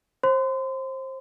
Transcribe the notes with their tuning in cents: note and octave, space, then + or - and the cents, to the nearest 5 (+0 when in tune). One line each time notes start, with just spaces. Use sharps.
C5 +25 C6 -35